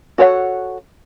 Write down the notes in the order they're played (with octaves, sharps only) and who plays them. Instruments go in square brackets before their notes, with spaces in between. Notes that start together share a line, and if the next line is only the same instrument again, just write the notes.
[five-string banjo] F#4 A4 C#5 F5 F#5